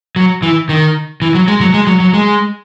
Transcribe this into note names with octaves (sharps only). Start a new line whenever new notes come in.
F#3
E3
D#3
E3
F#3
G#3
F#3
G#3
F#3
F#3
G#3